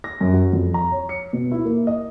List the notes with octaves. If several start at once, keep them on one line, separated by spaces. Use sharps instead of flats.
A#6
F#2
F#4
F2
A#5
C#5
C#7
B2
E4
A#3
D#5